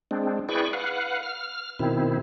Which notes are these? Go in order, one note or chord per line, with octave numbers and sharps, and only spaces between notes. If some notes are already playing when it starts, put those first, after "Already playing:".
G#3 C4 D4
E4 G#4 B4 D5 G5 C#6
B4 F5 F#5
F6
B2 D#3 C4 E4